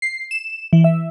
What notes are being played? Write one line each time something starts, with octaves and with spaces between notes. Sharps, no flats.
C7
E7
E3
E5